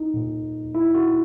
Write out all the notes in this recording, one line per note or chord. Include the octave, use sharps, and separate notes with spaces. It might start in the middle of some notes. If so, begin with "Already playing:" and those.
Already playing: D#4
A#2
A#2 E4
F#4